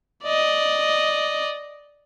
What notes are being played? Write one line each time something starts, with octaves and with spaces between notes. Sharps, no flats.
D5 D#5